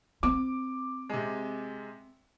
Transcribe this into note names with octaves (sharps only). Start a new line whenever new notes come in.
C4 D6
C3 G#3